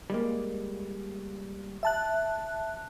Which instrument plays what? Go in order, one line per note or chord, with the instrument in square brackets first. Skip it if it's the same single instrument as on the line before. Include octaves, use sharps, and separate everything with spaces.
[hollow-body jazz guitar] G3 G#3 A#3
[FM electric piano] E5 A5 F#6